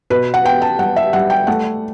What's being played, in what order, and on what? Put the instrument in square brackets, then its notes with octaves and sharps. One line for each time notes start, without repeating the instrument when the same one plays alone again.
[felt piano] B2 B4
F#5
B3 G5
A5
G3 F#5
E5
G3 F#5
G5
A3 F#5